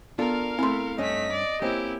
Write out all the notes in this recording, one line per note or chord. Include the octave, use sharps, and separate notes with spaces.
B3 D4 F4 A4 A#4 F5
A3 C4 E4 C6
G2 A3 C#4 D#5 B6
D5
A#3 C4 C#4 E4 G4